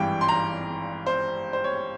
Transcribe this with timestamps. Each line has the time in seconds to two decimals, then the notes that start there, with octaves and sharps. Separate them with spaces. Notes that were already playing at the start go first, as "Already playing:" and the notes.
Already playing: G#1 G2 E3 G5
0.21 C6
0.29 A#5
1.06 C5
1.53 C5
1.64 C#5